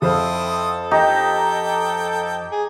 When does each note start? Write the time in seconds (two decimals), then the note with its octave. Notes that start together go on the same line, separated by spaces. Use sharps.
0.02 F2 C4 E4 A4 C5 F5 D#6
0.91 D#4 G4 G5 A#5
2.52 G#4